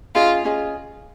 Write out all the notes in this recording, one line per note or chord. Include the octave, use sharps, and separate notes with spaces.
C#4 F4 G#4 D#5
C#4 G#4 D#5